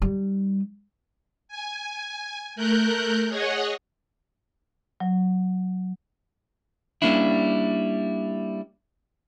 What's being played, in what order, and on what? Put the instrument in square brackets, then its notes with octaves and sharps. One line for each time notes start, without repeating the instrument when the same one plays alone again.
[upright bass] G3 D#4
[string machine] G#5
A3 A#4 F#6 G6
G#4 C#5 D#5 F#5
[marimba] F#3
[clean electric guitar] G3 A#3 C#4 D4 E4